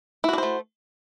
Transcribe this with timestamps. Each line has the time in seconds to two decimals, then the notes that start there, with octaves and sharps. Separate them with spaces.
0.24 E4
0.29 F#4
0.33 D4
0.38 C5
0.43 A3